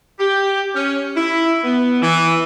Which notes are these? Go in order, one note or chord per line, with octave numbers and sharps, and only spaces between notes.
G4
C#4
E4
B3
E3